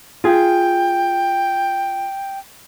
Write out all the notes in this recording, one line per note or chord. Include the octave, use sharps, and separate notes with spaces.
F4 G#4 G5